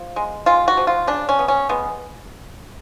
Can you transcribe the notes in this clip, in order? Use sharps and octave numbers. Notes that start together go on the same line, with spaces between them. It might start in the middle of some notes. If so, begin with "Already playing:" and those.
Already playing: F3
G#3
G#3 F4
F#4
F3
F4
C#3 D4
C#4
B3
C#4
G#3 B3